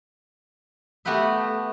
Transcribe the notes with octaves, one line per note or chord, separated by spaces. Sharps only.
A3 B3 F#4 G4 B4 E5